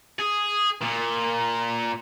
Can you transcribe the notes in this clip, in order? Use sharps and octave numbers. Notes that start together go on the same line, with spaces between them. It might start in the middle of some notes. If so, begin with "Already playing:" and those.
G#4
A#2